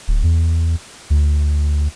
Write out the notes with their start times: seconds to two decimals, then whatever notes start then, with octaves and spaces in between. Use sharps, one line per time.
0.08 D1
0.24 E2
1.10 D2